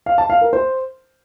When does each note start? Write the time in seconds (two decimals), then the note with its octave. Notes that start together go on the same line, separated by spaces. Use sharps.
0.06 F5
0.18 A5
0.30 F5
0.41 A#4
0.53 C5